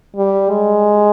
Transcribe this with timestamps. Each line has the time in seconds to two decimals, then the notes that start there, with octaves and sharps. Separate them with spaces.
0.16 G3
0.50 G#3